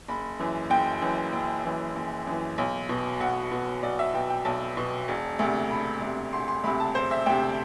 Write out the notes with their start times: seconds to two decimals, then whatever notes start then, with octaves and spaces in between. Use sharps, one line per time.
0.08 F#1 B5
0.39 F#2 E3
0.70 F#1 G5
1.02 F#2 E3
1.33 F#1
1.65 F#2 E3
1.96 F#1
2.27 F#2 E3
2.58 B1
2.89 B2
3.20 B1 F#5
3.52 B2
3.83 B1 D5
3.99 E5
4.14 B2 G5
4.30 G5
4.45 B1 A5
4.77 B2
5.08 E1
5.39 D2 C3
5.70 E1 B5
6.02 D2 C3
6.33 E1 C6
6.48 C6
6.64 D2 C3 B5
6.80 A5
6.95 E1 C5
7.11 E5
7.26 D2 C3 G5